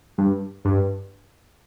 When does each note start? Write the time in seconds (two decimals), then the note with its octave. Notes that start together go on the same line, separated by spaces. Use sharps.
0.18 G2
0.65 G2